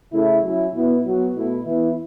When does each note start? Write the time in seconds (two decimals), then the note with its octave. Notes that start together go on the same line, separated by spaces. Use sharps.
0.12 C#3 A3 E4
0.42 F#3 C#4 E4
0.73 B2 B3 E4
1.03 F#3 B3 F#4
1.33 B2 A3 E4
1.64 E3 B3 E4